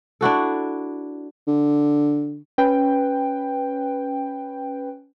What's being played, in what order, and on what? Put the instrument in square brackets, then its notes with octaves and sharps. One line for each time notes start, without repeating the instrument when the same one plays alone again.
[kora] D4 E4 F#4 A4
[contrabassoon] D3
[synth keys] C#4 B4 G5